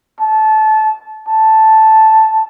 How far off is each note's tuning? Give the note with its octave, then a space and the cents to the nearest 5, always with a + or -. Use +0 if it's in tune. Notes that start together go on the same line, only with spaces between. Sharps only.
A5 -20
A5 -5